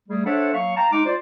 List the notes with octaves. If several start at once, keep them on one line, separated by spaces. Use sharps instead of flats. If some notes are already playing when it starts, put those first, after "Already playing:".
G3 A3 G#4
D4 A4 C5 C#5 E5 F#5
F#3 A#3 F5 C#6
F5 G5 A5 A#5
G#3 D#4 D6
F4 C5 D5